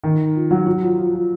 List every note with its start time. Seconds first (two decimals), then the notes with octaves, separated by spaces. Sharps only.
0.04 D#3
0.35 F3
0.51 F#3
0.67 F#3
0.82 F3
0.98 F3
1.13 F3